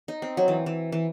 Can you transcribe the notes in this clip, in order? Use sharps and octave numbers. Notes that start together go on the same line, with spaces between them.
D#4
C4
F#3
E3
E3
E3